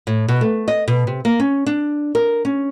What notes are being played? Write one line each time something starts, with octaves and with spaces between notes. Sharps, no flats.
A2
B2
A3
D#5
B2
C3
A#3
C#4
D4
A#4
C#4